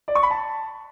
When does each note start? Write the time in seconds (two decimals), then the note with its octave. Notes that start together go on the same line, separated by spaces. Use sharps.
0.08 D5
0.15 C#6
0.23 B5
0.31 A5